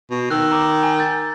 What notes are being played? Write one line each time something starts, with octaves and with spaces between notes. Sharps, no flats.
B2
D#3 E6 F#6
A#5 D6
G#5
G6 A6